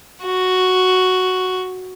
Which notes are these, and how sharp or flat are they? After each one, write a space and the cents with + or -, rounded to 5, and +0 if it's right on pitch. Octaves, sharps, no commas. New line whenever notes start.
F#4 +0